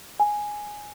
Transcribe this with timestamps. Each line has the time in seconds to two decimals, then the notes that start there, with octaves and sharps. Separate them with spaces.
0.20 G#5